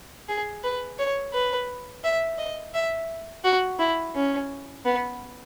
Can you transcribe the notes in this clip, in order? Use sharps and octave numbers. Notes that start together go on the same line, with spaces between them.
G#4
B4
C#5
B4
E5
D#5
E5
F#4
E4
C#4
B3